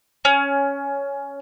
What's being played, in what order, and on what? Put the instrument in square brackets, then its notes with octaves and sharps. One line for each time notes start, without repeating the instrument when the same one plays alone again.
[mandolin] C#4